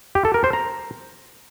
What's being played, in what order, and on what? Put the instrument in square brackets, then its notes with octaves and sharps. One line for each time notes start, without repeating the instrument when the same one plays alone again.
[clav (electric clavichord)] G4
A4
A#4
C5
A#5